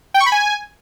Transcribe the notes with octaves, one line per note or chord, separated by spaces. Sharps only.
G5
C#6
B5
G#5